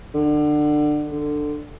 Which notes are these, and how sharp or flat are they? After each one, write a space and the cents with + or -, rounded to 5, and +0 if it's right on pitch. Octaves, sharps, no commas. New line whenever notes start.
D3 +25
D3 +15